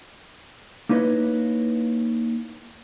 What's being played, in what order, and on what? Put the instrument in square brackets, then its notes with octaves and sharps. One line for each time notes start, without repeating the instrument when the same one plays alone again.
[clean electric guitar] A#3 D#4 E4 B4 C#5 D#5